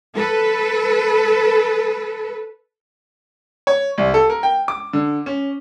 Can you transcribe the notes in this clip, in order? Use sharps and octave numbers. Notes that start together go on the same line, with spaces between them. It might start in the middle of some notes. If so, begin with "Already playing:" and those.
A4 B4
C#5
C2
A4
A#4
G5
D6
D3
C#4